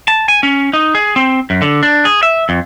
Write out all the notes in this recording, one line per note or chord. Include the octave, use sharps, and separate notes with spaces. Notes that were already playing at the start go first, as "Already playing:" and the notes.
A5
G#5
C#4
D#4
G#4
C4
F#2
D3
D4
G#4
E5
F2